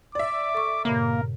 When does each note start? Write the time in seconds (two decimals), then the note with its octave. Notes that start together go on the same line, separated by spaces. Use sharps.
0.15 D5 E5 D6
0.54 A4 C#6
0.85 G2 A#2 C#3 A#3 A#4